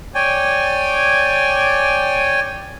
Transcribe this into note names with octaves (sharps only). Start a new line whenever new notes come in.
C#5 D5 G5 G#5